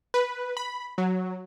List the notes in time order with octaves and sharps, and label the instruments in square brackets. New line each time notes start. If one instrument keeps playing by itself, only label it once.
[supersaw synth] B4
B5
F#3